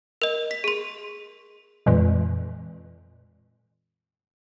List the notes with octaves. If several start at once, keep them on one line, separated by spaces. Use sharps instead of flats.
A#4 D#5
B6
G#4 C6
F2 A#2 E3 G#3